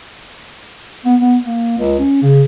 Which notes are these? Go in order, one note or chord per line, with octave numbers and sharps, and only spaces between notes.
B3
B3
A#3
C#2
C#4
C#3